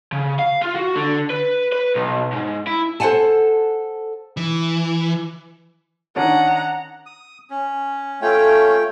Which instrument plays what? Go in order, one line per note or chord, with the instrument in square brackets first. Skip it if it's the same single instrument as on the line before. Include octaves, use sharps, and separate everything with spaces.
[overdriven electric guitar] C#3
F5
F4
F#4
D3
B4
B4
B1
G#2
E4
[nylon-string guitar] A4 C5 C#5 F#5 G#5 A5
[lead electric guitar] E3
[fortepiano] D#3 C#4 D4 [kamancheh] F#5 A#5
[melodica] D#6
C#4
[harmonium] A3 G5 [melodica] C#4 F4 C#5